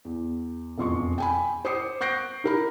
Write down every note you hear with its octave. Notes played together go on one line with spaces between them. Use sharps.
E2
E1 F2 C6 C#6
G5 G#5 B5
C5 D6 D#6 C7 C#7
C#6 F#6 G6 A#6 C7 D7
D#4 A#4 B5